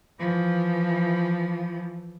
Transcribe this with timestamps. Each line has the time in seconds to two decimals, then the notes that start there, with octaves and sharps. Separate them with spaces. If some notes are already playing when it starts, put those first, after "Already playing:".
0.19 E3 F3